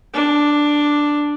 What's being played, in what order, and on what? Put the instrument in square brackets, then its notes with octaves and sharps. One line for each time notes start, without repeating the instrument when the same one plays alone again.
[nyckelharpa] D4